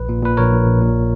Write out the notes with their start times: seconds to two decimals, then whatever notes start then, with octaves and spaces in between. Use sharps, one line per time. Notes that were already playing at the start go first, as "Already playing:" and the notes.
Already playing: A#1 B4
0.09 A#2
0.22 A#2 B4
0.37 A#1 A#4 C#5
0.52 A#1
0.66 A#1
0.81 A#2